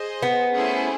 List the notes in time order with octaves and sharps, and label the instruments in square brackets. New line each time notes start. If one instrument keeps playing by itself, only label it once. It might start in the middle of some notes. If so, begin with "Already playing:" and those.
Already playing: [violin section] G#4 C5 D#5
[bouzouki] B3
[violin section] A3 C#4 E4 G#4 C5